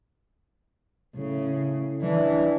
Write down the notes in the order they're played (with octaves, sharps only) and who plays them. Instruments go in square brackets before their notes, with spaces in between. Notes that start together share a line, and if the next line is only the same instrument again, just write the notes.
[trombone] A2 [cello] C#3
[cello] E3 [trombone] D4